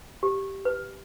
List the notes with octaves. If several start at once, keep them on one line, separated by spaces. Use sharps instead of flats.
G4
B4